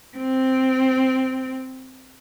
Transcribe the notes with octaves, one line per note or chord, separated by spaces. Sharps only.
C4